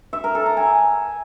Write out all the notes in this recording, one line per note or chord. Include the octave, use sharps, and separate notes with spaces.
E5
A#4
A4
A#5
G#5